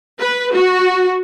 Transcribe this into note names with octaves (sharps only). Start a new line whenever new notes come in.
B4
F#4